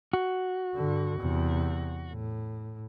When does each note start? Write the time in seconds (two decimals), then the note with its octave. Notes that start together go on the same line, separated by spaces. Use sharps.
0.13 F#4
0.75 G2 D3
1.18 E2 C3
2.11 A2